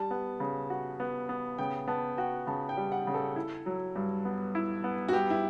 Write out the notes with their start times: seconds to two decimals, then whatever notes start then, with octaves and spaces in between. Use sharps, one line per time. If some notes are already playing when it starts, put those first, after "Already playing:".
Already playing: G3 A5
0.11 B3
0.40 C#3
0.70 F#4
1.00 B3
1.29 B3
1.58 C#3 G5
1.87 B3 A5
2.17 F#4 G5
2.47 C#3 A5
2.69 G5
2.77 G3
2.92 F#5
3.07 C#3
3.14 A4
3.36 E4
3.66 F#3
3.96 G2
4.25 B3
4.55 E4
4.84 B3
5.09 F#4
5.13 G2 G4
5.30 E4